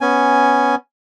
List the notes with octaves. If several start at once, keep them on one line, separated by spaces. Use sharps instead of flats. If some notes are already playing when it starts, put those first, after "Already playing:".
B3 C#4 G#5